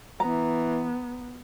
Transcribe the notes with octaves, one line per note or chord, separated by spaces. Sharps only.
E3 B3 A#5